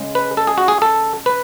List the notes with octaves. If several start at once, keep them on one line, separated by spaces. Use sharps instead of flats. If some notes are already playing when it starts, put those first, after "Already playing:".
Already playing: C#3 G#3
B4
A4
G#4
F#4
G#4
A4
B4